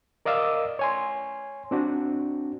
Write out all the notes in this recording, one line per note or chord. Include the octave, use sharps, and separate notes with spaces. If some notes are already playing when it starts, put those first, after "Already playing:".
A#4 D5 D#5 F5 D6 E6
C#5 G#5 C6
C4 D4 F#4